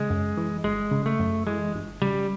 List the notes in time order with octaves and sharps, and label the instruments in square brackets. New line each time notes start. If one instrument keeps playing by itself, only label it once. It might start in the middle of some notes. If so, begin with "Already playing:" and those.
Already playing: [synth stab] C#3 [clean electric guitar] G#3
[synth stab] F#2
E3
[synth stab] G1 [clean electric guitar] G#3
[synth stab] C#3
[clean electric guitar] A3
[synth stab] F#2
[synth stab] E3 [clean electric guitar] G#3
[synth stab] G1
[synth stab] C#3 [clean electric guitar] G3